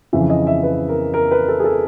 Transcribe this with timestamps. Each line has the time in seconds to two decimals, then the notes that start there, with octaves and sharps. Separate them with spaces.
0.13 F2 C#3 E3 E5
0.30 D#5
0.47 E5
0.63 B4
0.89 A#4
1.14 A#4
1.31 B4
1.48 A4
1.60 G#4
1.64 A4